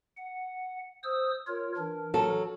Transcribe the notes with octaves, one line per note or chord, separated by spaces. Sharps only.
F#5
C5 D#6 E6
F4 A#4 C#5
E3 D4 A#4
F#3 A4